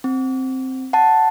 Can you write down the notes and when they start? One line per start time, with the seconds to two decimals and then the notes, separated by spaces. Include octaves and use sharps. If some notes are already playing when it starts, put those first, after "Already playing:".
0.04 C4
0.93 F#5 A5